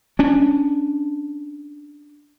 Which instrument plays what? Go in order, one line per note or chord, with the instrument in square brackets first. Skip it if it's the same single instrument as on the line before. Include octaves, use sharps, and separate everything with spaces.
[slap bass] C#4 D4